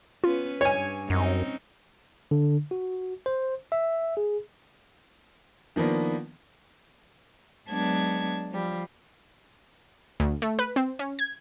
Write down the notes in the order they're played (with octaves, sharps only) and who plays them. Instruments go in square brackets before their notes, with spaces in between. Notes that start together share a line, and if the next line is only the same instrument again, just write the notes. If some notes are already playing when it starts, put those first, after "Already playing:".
[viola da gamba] B3 C#4 B4 [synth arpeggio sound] F4
[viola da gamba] G2 [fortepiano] C#5 G#5
[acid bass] F#2 [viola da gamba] C4 C#4 D#4
[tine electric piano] D3
F#4
C5
E5
G#4
[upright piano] D#3 F3 A#3 B3 D4
[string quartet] F#3 G#3 B3 D4 A5 G#6
F3 G3
[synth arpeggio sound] D2
A3
B4
C4
C#4
G#6